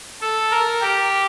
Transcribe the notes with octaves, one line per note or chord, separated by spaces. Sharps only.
A4
A#4
G4